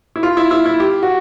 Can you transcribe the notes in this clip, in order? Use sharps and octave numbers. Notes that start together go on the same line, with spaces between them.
E4
F4
E4
E4
E4
G4
F#4